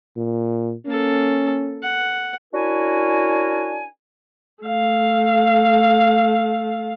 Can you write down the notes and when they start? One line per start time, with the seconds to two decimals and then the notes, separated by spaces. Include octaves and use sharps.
0.17 A#2
0.86 A#3 C#4 A4
1.83 F#5
2.53 C#4 D4 E4 F#4 A#4 G#5
4.64 A3 F5